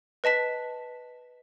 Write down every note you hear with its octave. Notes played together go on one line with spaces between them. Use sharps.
B4 D#5 A5 B6